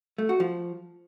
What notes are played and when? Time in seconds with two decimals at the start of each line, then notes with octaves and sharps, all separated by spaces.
0.18 A3
0.29 F#4
0.40 F3